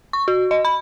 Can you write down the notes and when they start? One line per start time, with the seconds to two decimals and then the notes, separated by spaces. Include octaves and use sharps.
0.13 C#6
0.28 F#4
0.51 D#5
0.65 B5